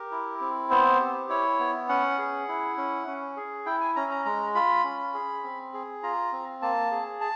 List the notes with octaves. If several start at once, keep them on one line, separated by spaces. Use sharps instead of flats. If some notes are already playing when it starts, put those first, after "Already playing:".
Already playing: G4 A#4
E4
C4
B3 C5
G4
E4 C#5
B3
C#4 F#5
G#4
E4
C#4
C#4
G#4
E4 G5
G#5
C#4 A#5
A#5
G#3 A#5
F4 B5
C#4
G#4
C4
G#4
F4 A#5
C4
A#3 A5
G#4
A5